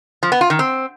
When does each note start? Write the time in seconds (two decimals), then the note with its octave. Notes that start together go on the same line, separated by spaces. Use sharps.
0.23 F3
0.32 B3
0.41 F4
0.50 D#3
0.59 C4